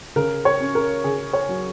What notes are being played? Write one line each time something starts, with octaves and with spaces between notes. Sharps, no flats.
C#3 A#4
C#5
C#4
A#4
C#3 G#4
C#5
F#3